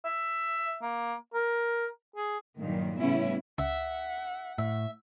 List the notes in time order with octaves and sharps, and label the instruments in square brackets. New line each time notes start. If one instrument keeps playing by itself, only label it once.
[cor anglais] E5
A#3
A#4
G#4
[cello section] G2 A#2 D#3 F#3
A2 C#3 G3 B3 C#4 E4
[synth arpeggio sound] C#2 [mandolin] E5 [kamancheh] F#5
[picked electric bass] A2 [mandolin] E5